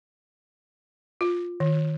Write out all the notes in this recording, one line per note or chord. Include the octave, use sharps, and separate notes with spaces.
F4
D#3